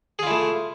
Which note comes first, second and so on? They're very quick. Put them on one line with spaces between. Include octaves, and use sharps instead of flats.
G#4 F4 E4 A3